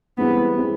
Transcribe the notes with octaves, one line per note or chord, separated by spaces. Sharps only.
G2 E3 G#3 B3 C4 E4
E3 G#3 C4 E4